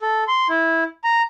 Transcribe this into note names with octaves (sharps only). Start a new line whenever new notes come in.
A4
C6
E4
A#5